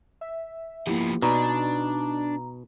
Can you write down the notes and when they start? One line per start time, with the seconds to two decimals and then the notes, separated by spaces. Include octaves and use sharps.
0.21 E5
0.87 F3 A#3 B3 E4 G4
1.22 B2 D4 D#4 A#5